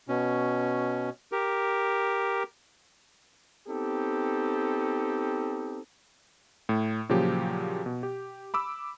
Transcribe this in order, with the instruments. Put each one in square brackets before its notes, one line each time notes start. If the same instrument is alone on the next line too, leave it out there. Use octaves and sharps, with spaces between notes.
[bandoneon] B2 C#4
G4 A#4
[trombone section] B3 C4 D#4 G4 A4
[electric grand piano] A2
A#2 C#3 F3 F#3 G4
B2
G4
B5 D6 E6